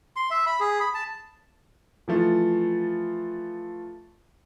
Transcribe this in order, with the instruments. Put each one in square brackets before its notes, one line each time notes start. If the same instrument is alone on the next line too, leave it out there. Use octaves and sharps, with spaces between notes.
[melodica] C6
E5
B5
G#4
B5
A5
[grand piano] E3 F3 A3